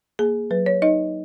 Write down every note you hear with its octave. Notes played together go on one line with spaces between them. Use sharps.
A#3 G#4
F#3 B4
C#5
D#4 D#5